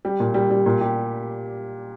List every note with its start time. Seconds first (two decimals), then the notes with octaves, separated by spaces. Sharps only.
0.05 G3
0.20 A#2
0.34 G3
0.51 G3
0.66 A#2
0.81 G4